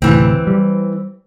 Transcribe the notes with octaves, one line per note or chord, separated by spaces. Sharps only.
D2 A2 C3 E3 C4
G3